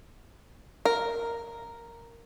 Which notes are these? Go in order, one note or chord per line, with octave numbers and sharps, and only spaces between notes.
A#4